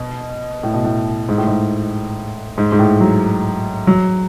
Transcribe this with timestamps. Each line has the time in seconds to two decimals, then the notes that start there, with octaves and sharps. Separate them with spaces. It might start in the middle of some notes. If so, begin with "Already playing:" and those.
Already playing: B2
0.63 A2
0.74 B2
0.85 A2
1.29 G#2
1.38 A2
1.47 G#2
2.58 G#2
2.72 G#2
2.79 A2
3.00 F#3
3.87 F#3